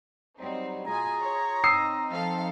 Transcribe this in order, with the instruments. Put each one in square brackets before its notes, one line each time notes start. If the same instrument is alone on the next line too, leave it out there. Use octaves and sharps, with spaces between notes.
[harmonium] F#3 G3 [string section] C4 D#4
[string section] B2 G#5 [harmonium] F4 G#4 [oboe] A#5
[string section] C#5
[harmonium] C4 D#4 [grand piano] D#6 E6 C7
[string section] F3 A4 F5